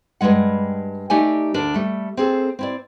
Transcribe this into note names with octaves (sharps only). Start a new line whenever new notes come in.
G2 D#3 G3 G#3 F#5
A3 D#4 G4 D5 D#5 G#5
D2 D4 A#4
G3 A3
C4 G#4 A4
C4 E4 D5